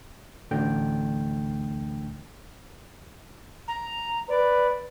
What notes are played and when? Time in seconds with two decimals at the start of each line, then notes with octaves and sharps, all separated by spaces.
0.51 A1 D2 D3 G5
3.68 A#5
4.29 B4 D5